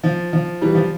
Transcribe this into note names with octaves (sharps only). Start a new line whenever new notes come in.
F3
F3
E3 G3
F3